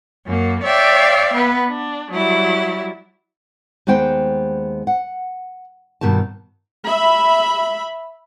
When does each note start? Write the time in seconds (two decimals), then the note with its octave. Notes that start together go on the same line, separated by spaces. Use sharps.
0.25 F#2 A#3
0.63 C#5 D5 E5 F5 G5
1.33 B3 B4
1.68 D4
2.11 F#3 G3 E4
3.87 D#2 G#3 B3 C5 G5
4.87 F#5
6.01 G2 B2 D#3 G3 A5
6.83 E5 B5